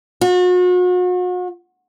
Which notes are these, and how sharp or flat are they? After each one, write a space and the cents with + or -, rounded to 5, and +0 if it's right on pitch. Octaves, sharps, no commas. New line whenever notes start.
F#4 -40